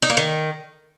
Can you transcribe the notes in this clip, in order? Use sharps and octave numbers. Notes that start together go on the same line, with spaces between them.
D#4
A#3
D#3